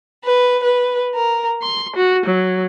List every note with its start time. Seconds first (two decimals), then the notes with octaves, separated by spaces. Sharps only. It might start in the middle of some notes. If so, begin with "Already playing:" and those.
0.24 B4
0.64 B4
1.15 A#4
1.63 C6
1.96 F#4
2.26 F#3